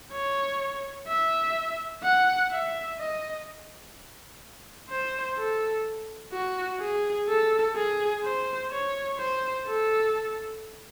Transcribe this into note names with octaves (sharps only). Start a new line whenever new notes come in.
C#5
E5
F#5
E5
D#5
C5
A4
F#4
G#4
A4
G#4
C5
C#5
C5
A4